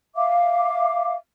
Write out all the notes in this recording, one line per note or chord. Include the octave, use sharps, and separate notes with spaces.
E5 F5 D6